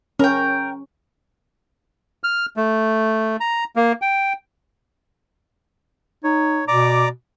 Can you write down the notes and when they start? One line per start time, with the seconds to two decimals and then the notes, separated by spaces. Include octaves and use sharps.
0.19 C#4 A#4 G5
2.24 F6
2.57 A3
3.40 A#5
3.76 A#3
4.02 G5
6.24 D#4 C#5
6.68 B2 D5 A#5 D6